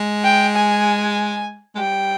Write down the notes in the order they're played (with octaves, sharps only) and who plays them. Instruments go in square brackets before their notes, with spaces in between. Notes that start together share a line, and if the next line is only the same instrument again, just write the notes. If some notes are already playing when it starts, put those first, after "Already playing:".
Already playing: [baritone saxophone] G#3
[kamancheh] G5
G#5
[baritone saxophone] G#3
[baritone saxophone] G3 [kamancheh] G5